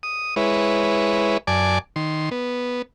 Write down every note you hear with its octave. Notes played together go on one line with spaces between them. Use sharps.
D#6
G#3 E4 B4 C#5
F#2 D5 G#5 A5 D6
D#3 C6
B3